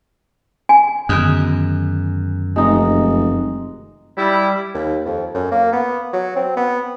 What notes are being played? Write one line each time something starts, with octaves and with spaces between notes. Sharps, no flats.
G#5
F#2 D3 D#3 B3 G#4
F1 G#3 D#4
G3 E4
D#2
F2
F#2
A#3
B3
F#3
C4
B3